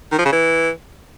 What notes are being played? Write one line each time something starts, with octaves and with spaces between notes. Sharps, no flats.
D#3
F3
C#3
E3